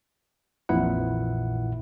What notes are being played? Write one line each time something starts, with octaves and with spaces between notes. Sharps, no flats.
A#1 F2 A#2 E3 E4 F#5